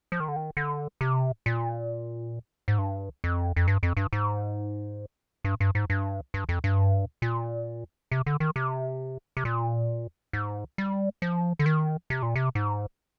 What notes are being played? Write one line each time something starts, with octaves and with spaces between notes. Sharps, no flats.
F3
D#3
D3
D#3
D3
C3
A#2
G#2
G2
F2
F2
G2
F2
G2
G#2
G2
G2
G#2
G2
G2
F2
G2
A#2
C3
D3
D#3
C3
C3
A#2
G#2
G3
F3
D3
D#3
C3
A#2
C3
G#2